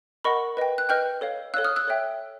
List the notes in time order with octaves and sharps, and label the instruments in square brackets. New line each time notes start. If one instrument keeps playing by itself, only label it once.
[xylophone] A#4 D#5 F#5 B5 C#6
B4 D#5 G5
F#6
B4 D#5 G5 F6 G6
A4 C#5 F5
A4 C#5 F5 E6 F#6
D#6 F6
E6 F#6
A4 C#5 E5 G5